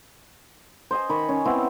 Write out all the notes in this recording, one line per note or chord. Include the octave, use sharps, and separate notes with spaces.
C5 D#5 G#5
D#3 B5 C#6
C#4
B3 C4 E4